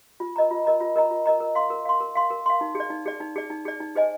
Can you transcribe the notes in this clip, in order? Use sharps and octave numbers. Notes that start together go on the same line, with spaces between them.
F4
A#4 D#5 A#5
F4
A#4 D#5 A#5
F4
A#4 D#5 A#5
F4
A#4 D#5 A#5
A#4
F5 C6
A#4
F5 C6
A#4
F5 C6
A#4
F5 C6
D#4
G#4
D5
D#4
G#4 D5
D#4
G#4 D5
D#4
G#4 D5
D#4
G#4 C5 D#5 G#5